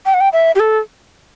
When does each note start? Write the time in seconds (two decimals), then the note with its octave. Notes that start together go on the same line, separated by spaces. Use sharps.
0.06 G5
0.14 F#5
0.20 G5
0.33 E5
0.55 G4
0.59 A4